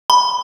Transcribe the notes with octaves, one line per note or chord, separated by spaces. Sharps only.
B5